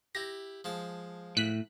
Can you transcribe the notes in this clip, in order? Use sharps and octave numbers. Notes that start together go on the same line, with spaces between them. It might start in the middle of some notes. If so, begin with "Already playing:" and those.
E4 G4 A#6
F3 G#3 A5
A2 F#6 B6